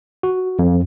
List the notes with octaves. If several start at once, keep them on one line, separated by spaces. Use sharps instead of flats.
F#4
F2